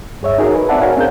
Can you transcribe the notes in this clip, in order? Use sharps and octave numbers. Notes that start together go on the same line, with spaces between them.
G2 G#4 C#5 E5
D#4 F#4 G#4 A#4
B4
C4 D#4 D5 E5 F#5 A5
F#4 A#4 C#5 F5 F#5 G#5
C4 D4 G#4 A#4 G6